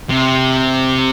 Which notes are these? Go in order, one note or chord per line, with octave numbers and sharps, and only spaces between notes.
C3